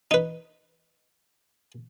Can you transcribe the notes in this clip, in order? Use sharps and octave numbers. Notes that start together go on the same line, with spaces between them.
D#4 B4